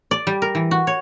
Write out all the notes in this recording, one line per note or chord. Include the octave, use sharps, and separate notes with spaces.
D5
G3
A#4
E3
F#4
C#5